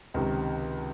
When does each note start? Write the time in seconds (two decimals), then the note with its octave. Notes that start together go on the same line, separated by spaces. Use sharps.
0.14 C#2 C3 D#3